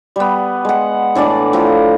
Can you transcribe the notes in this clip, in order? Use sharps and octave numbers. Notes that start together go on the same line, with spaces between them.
G3 B3
G#3 F#5
A2 E3 D4 D5
A2 F3 A#5